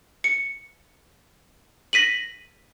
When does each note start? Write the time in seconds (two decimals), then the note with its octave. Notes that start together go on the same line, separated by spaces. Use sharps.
0.24 C#7
1.93 A#6 B6 D#7 F#7